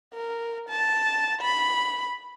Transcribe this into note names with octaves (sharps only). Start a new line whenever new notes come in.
A#4
A5
B5